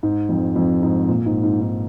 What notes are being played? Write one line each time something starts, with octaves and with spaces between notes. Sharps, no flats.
G#2
F2
F2
G#2
A#2
G#2
G#2
G#2